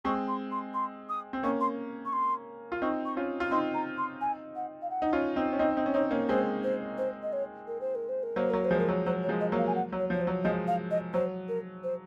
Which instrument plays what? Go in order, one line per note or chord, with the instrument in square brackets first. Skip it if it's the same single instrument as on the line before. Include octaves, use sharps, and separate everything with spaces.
[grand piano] G#3 C4 [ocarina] C#6
[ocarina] C6
C6
C6
D#6
[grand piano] C4
[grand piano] A#3 C#4 [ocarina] C#6
[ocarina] C6
C#6
C6
[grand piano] F4
[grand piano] C4 D#4 [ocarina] C#6
[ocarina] C#6
[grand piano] C#4 F4
F4
[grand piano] C4 D#4 [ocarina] C6
[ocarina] A#5
C6
G#5
F#5
F5
F#5
[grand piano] D#4
C#4 F4
C4 D#4
C#4
[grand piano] C4 D#4 [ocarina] D#5
[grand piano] C4 D#4
C#4
[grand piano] C4 D#4 [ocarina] C#5
[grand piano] A#3 C#4
[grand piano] G#3 C4 [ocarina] C5
[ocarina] C5
C5
D#5
C#5
A#4
C5
A#4
C5
A#4
[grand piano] F#3 A#3 [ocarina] C5
[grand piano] F#3 [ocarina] A#4
[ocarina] C5
[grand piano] F3 G#3
[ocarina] A#4
[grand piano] F#3
[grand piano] F#3 [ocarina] C5
[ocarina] C#5
[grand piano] F3 G#3
[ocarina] D#5
[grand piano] F#3 A#3
[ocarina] F5
G#5
F#5
[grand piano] F#3
[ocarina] C#5
[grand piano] F3 [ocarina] C#5
[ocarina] C5
[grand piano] F#3
[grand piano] F3 G#3 [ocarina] D#5
[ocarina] F5
D#5
[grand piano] F#3 [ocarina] C5
[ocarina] A#4
C5